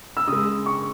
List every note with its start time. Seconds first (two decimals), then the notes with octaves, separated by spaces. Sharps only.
0.17 E6
0.27 C#3 G#3 D#6
0.66 C#6